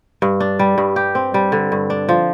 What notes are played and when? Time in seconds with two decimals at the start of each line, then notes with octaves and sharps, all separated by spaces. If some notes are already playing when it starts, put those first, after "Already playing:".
0.22 G2
0.40 D4
0.59 G3
0.78 G2
0.96 G4
1.15 C4
1.34 G3
1.52 D3
1.72 G2
1.90 D4
2.09 F3